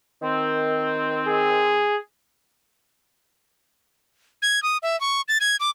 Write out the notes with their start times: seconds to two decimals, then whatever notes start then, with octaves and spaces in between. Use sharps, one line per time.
0.22 D#3 C4
1.28 G#4
4.42 G#6
4.63 D#6
4.83 E5
5.01 C#6
5.28 A6
5.40 G#6
5.60 D6